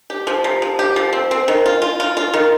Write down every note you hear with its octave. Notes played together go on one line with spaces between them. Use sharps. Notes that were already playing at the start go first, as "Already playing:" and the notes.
G4
F3
C3
F3
G4
F3
C4
C4
D#3
F4
F4
F4
F4
D#3